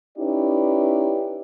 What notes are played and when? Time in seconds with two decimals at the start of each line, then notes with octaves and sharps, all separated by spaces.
0.18 C#4 D#4 E4 G4 B4 D5